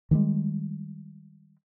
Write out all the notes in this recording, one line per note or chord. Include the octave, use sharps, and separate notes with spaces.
D#3 F3 G3 G#3